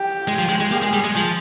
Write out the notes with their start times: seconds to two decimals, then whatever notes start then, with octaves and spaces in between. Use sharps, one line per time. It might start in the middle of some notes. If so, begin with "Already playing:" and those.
Already playing: G4
0.28 G#3
0.39 F3
0.49 G#3
0.61 G#3
0.71 A#3 G#4
0.82 G#3
0.93 G3
1.04 G#3
1.16 F3